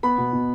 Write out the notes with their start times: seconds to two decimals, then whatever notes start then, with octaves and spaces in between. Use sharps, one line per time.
0.03 B3 B5
0.18 B2
0.33 B2